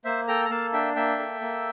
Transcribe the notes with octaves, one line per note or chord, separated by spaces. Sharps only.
A#3 C5 E5
A4 G5 A#5
A#5
A#3 F5 A5
D4 E5 G5
A#3 E5 G5
A4
A#3